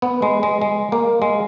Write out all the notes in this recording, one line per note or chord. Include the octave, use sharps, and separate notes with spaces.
B3
G#3
G#3
G#3
A#3
G#3